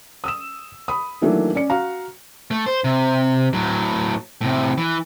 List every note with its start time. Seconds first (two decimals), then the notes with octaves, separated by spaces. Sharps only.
0.24 D#6 E6 E7
0.88 B5 D#6
1.22 D#3 E3 F#3 A3 A#3 D4
1.55 C#4 D5 C#7
1.70 F#4 F5 A#5
2.51 A3
2.66 C5
2.84 C3
3.53 A2 F#3
4.41 A2 C3
4.78 E3